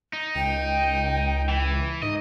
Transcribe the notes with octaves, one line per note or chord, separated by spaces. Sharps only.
D#4
C#2 G5
E3
G#2 D#4 D#5